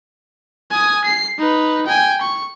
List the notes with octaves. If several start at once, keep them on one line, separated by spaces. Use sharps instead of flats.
G#5 D#6
C7
D#4 B4
G5 G#5
C#6